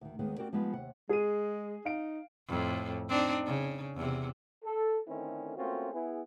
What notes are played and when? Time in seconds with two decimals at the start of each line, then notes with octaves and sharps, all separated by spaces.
0.01 D2 D#3
0.19 D#2 D#3 G#3 B3
0.38 C4 F#4 G4 A#4 D5
0.53 F3 G3 G#3 B3 D#4 F4
0.73 D#2 C3 F#5
1.09 G#3 G#4 D#7
1.85 D#4 F5 D7
2.48 F2 A2
3.09 C4 D4 D#4
3.46 C#3
3.96 E2 C3
4.64 A4
5.08 D3 D#3 A3 C4 C#4 E4
5.57 A3 A#3 C4 C#4 F4 F#4
5.92 B3 E4 G#4